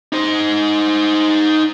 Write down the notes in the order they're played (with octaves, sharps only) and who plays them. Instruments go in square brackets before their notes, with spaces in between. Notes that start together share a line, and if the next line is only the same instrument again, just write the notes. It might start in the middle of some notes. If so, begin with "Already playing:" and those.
[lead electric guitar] D#4 C5